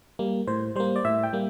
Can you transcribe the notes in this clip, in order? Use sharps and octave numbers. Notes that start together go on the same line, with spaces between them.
G3 A#3
A2 C5
G3 A#3 C5
D5
A2 E5
G5
G3 A#3